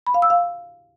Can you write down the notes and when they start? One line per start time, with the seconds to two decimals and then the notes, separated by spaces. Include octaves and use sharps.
0.07 B5
0.14 F5
0.22 E6
0.30 F5